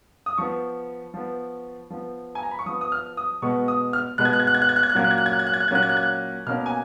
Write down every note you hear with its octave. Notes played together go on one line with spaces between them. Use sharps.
D#6
F3 B3 C#6
F3 B3
F3 B3
G#5
A#5
B5
C#6
F3 B3 D#6
D#6
F6
D#6
B2 G#3 B3 C#6
D#6
F6
B2 G#3 B3 F#6
G#6
F#6
G#6
F#6
G#6
F#6
G#6
F#6
G#6
F#6
A#2 F#3 A#3 C#4 G#6
F#6
G#6
F#6
G#6
F#6
G#6
F#6
G#6
F#6
G#6
A#2 F#3 A#3 C#4 F#6
G#6
F#6
G#6
F#6
B2 A#3 C#4 F6
G#5